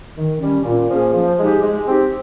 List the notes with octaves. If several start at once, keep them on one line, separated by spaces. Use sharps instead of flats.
D#3
G3 C#4
A#2
F3 A#3 C#4 G#4
F3
G#3 D#4 G4
G#3
C4 D#4 G4